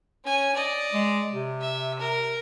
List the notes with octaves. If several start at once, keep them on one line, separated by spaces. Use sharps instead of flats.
C#4 G#5
D5 D#5
G#3
C3
E5
A#4